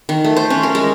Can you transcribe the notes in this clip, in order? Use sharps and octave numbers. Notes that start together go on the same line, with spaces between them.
D#3
A3
C5
C#4
A#4
G#3